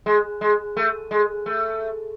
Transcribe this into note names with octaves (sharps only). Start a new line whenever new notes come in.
G#3
G#3
A3
G#3
A3